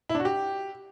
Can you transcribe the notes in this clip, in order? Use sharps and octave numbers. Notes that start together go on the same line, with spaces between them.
E4
D4
F#4
G4